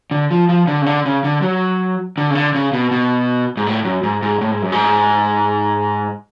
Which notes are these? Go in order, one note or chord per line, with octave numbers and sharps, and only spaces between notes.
D3
F3
F3
D3
C#3
D3
C#3
D3
F#3
D3
C#3
D3
C#3
B2
B2
G#2
A2
F#2
G#2
G#2
A2
G#2
F#2
G#2